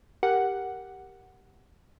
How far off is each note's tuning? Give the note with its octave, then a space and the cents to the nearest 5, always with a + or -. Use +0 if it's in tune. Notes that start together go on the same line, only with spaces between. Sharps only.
G4 +0 A#4 +0 F#5 +5